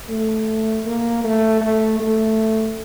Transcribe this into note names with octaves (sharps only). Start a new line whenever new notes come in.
A3
A#3
A3
A3
A3